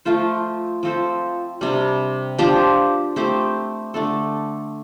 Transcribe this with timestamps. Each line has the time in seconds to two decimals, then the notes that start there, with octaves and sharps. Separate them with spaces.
0.05 F3 A3 F4 C5
0.83 F3 C4 A4 C5
1.61 C3 G3 D4
2.39 F3 D4 G4 C5
3.16 A3 C4 G4 C5
3.94 D3 A3 D4 A4